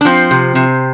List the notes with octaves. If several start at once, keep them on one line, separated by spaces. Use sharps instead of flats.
D4
F3 C4
C3
C3